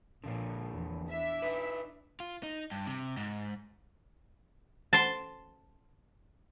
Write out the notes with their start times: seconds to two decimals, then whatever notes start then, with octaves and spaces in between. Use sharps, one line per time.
0.24 A#1 D3 F3 A#3
0.73 E2
1.10 D4 E4 E5
1.42 D#4 B4
2.20 F4
2.43 D#4
2.71 G2
2.87 C3
3.17 G#2
4.93 A5 C6